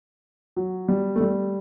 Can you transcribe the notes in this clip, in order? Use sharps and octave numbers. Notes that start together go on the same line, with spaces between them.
F#3
G3
A3
G3